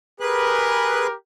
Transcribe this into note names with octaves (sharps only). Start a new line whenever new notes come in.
G4 G#4 A#4 B4 F#6